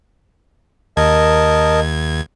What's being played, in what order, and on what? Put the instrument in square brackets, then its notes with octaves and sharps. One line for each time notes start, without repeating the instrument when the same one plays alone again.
[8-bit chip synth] D#2 G#6 [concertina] A#4 D#5 A5